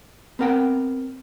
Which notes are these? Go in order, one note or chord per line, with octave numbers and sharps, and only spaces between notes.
B3 C4 A#4 F#5 G5